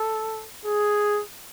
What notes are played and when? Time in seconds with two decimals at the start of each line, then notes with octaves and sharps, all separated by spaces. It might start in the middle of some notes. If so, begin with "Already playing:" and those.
Already playing: A4
0.65 G#4